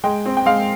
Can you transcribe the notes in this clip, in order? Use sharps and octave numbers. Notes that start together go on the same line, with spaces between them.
G#3 G5
C4
G5
G#3 F5